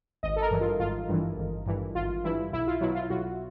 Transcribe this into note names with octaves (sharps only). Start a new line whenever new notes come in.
G#1 D#5
A4
A#4
G2 E3
F4
G#1 F4
G2 E3
G#1
G2 E3
G#1 F4
G2 E3 E4
B1 E4
F4
B2 F#3 E4
F4
B1 F#4